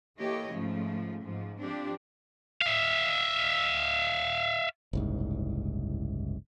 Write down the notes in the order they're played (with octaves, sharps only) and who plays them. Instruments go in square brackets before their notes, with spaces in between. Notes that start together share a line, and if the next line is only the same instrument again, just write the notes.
[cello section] E3 A#3 G4 A4 C#5 D#5
G#2 C#3 F3 A3
G#2 F3
F3 C4 D4 G4
[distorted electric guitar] E5 F5
[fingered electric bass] F#1 C2 G#2